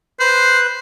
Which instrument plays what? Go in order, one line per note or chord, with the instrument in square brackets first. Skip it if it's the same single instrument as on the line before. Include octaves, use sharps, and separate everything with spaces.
[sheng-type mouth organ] B4 F#6 [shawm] C5